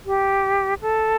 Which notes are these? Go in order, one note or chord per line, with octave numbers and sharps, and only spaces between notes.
G4
A4